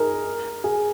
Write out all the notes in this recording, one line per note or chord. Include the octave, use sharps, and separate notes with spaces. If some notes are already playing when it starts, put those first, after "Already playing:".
Already playing: D#4 G#4 A#4
G#4